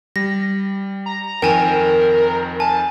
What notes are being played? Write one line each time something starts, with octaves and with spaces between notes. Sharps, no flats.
G3 A#6
A#5
F2 D#3 A#4 G5 G#5 A#5 E7
G#5 A5